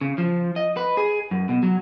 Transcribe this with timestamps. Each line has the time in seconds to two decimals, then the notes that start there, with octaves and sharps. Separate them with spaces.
0.01 C#3
0.18 F3
0.56 D#5
0.77 B4
0.97 G#4
1.31 F#2
1.49 B2
1.63 F#3